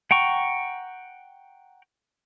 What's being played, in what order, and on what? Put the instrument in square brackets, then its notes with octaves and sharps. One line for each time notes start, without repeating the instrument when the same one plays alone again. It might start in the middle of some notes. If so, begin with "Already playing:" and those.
[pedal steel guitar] F#5 G5 A#5 C#6